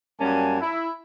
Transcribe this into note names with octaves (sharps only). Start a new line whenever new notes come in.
F#2 G3 A#3 C#4 G#5 A5
E4